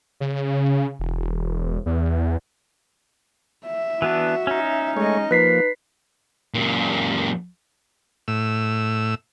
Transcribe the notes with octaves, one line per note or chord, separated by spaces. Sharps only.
C#3
E1
E2
E5
E3 B3 D4 F#4
C#4 D#4
G#3 A3 C#5 D#5
F3 A#3 D#4 B4 B6 C7
F#2 A#2
A2 E6